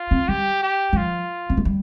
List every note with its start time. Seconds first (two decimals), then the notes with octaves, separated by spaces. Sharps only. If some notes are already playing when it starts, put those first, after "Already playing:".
Already playing: F4
0.11 C4
0.28 G3 G4
0.63 G4
0.93 G3
0.97 F3 F4
1.50 C4
1.57 A3
1.65 G3